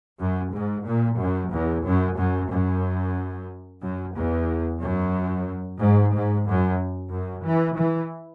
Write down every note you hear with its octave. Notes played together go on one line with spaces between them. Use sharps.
F#2
G#2
A#2
F#2
E2
F#2
F#2
F#2
F#2
E2
F#2
G#2
G#2
F#2
F#2
E3
E3